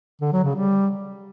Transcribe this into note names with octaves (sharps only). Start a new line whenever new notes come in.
D3
F#3
C#3
G3